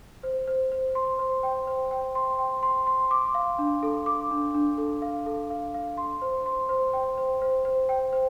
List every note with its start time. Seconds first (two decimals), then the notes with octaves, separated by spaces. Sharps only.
0.23 C5
0.48 C5
0.72 C5
0.95 C6
1.19 C5
1.43 G5
1.67 C5
1.91 G5
2.15 C6
2.39 G5
2.63 C6
2.87 C6
3.11 D6
3.34 F5
3.59 D4
3.83 A4
4.06 D6
4.31 D4
4.54 D4
4.78 A4
5.02 F5
5.26 A4
5.50 F5
5.74 F5
5.98 C6
6.22 C5
6.46 C6
6.69 C5
6.93 G5
7.18 C5
7.42 C5
7.65 C5
7.89 G5
8.13 C5